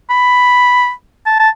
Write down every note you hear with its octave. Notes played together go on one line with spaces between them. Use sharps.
B5
A5
A5